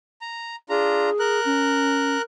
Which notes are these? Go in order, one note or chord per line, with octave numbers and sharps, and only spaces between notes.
A#5
D4 F4 G#4 A#5
A#4 F#6
C#4